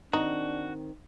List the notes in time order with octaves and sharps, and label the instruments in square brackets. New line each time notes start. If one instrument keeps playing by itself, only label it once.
[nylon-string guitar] D#3 C4 [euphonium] D4 [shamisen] D#4 [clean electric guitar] F#4